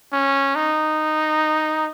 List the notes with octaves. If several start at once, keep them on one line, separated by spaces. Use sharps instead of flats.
C#4
D#4